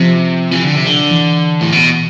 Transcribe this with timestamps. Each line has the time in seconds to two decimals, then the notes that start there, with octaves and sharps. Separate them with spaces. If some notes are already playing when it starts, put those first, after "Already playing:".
Already playing: C3 F3
0.51 E3
0.63 D3
0.76 C3
0.87 D3
1.11 E3
1.61 A2
1.72 B2